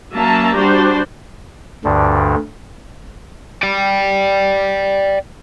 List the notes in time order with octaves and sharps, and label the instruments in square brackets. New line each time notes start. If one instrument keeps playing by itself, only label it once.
[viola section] F#3 A#3 C#4 E5 A5 A#5
G3 D4 F#4 G4 C5
[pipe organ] D2 G2 D3
[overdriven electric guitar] D5 G5